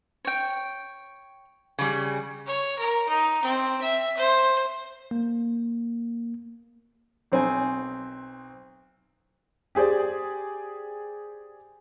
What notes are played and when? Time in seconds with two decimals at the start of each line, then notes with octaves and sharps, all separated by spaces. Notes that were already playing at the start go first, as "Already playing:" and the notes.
0.25 C#5 G5
1.79 C#3 G3
2.46 C#5
2.78 A#4
3.08 D#4
3.43 C4
3.81 E5
4.17 C5
5.11 A#3
7.32 B1 C4 G#5
9.75 G4 G#4 C5 D5